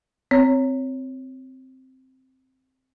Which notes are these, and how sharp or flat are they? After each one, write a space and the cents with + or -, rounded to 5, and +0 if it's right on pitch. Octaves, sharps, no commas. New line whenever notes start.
C4 +0 C#5 +0